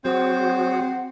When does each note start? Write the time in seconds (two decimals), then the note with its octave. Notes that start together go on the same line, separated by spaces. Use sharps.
0.05 F#3 C4 F#4 G#4 C5 F#5